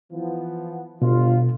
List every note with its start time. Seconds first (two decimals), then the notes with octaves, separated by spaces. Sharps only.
0.12 E3 F3 B3
1.02 G1 B2 F4